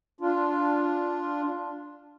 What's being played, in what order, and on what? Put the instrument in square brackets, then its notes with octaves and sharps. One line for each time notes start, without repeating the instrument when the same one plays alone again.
[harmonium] D4 F4